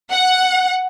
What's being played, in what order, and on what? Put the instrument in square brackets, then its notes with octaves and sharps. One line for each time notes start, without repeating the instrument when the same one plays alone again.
[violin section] F#5